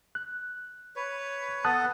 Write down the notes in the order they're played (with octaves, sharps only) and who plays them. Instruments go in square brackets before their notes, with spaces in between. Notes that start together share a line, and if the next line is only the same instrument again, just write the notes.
[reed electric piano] F#6
[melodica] B4 C#5
[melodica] B3 A4 [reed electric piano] A5 D#6 F#6